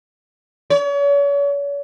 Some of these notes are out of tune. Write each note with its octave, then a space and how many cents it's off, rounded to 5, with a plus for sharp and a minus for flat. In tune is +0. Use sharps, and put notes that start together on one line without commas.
C#5 +40